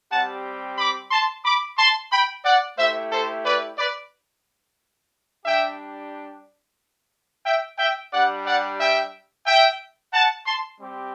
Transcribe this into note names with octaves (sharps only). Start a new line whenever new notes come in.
G3 C4 G4 F#5 A5
B5 D6
A5 C6
B5 D6
A5 C6
G5 B5
D5 F#5
A3 E4 G4 C5 E5
A4 C5
B4 D5
B4 D5
G3 D4 G4 E5 G5
E5 G5
E5 G5
G3 D4 G4 D5 F#5
D5 F#5
E5 G5
E5 G5
F#5 A5
A5 C6
G3 C4 G4